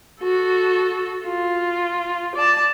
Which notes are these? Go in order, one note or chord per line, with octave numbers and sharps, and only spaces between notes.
F#4 A4
F4
D5 A5